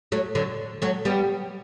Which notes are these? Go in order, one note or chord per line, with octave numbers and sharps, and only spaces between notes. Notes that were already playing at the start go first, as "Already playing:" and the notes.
F#3 A3
D3 F#3
F#3 A3
G3 B3